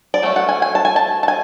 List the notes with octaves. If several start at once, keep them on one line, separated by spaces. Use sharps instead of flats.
D5
F#3 A3 C#4
F#5
G#5
G#5
A5
G#5
A5
A5
G#5